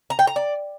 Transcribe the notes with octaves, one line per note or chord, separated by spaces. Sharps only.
A#5
G5
A#5
D5